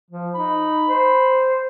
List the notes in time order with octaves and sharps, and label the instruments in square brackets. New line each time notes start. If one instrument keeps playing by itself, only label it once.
[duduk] F3
[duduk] D#4 [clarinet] B5
[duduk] C5